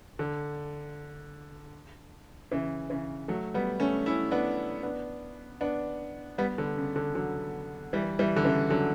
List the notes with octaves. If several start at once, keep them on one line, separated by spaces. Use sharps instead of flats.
D3
C#3 E3
C#3 E3
F#3 A3
G3 B3
A3 C#4
C#4 E4
B3 D4
B3 D4
B3 D4
G3 B3
D3
C#3
D3
D3 F#3
E3 G3
E3 G3
D3
C#3 E3
D3 F#3